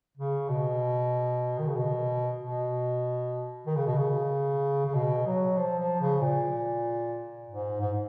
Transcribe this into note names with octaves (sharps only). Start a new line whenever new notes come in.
C#3
B2
D#3
C#3
B2
B2
D#3
C#3
B2
C#3
C#3
B2
F#3
F3
F3
C#3
A#2
G#2
G#2